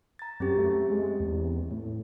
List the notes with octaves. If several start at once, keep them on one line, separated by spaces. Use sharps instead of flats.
A#5 A6
F#2 C4 C#4 G4
A3
G#3
E2
A2